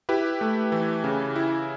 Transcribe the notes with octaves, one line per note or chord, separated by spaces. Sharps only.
E4 G4 B4
A3
E3
C#3
E4